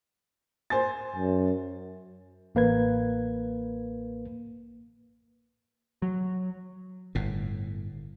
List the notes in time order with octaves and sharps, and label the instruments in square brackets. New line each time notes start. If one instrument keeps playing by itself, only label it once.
[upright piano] C5 G#5 A6
[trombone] F#2
[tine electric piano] A1 A#3 B4 G#6
[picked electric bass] F#3
[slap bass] G1 A2